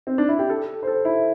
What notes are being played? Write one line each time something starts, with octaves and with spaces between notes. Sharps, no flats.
C4
D4
E4
G4
A4
C5
A4
E4